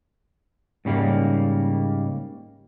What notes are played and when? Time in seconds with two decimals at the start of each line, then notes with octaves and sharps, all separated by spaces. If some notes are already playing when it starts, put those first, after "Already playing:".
0.85 G#2 C#3 G3 A#3